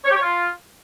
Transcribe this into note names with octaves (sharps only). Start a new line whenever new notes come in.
C#5
G4
C#5
F4